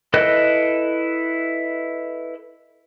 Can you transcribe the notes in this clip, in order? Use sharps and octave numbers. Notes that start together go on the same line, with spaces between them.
E4 A4 B4 D#5 F#6